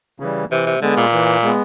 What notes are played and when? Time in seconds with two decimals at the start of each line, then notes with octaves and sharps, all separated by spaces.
0.20 C#3 E3 G3
0.51 C3 E3
0.66 C3
0.81 D3 G#3 B3
0.97 A#2
1.13 E3
1.43 G#3 B3